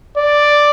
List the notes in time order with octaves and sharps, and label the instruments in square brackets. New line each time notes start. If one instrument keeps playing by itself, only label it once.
[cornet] D5